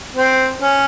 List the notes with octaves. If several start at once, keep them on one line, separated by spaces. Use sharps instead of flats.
C4
C#4